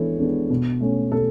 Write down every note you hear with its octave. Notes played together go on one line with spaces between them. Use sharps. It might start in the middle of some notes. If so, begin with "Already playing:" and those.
Already playing: E3 G#3 B3 D4 A4 C#5
G#3 B3 D4
B2
A3 C#4
B2 A4